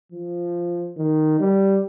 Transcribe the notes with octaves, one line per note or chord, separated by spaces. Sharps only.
F3
D#3
G3